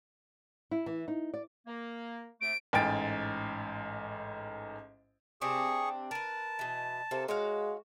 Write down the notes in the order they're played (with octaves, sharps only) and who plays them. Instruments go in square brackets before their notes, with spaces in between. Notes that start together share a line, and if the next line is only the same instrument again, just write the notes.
[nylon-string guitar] E4
E3
D#4
D5
[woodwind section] A#3
[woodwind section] C3 A3 [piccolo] D7
[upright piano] A1 G#2 G5 G#5 A6 D7
[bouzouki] C3 C4 D4 [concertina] G#4 C#6
[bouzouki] A#4 B4 [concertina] A5
[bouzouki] B2 E3
[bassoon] C3 [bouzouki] A#3 A4
[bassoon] G#3 [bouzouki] F#4 C#5 F5